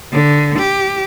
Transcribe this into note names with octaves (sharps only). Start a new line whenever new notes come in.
D3
G4